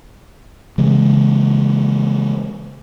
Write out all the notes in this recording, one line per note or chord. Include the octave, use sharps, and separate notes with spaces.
C#3 E3 G#3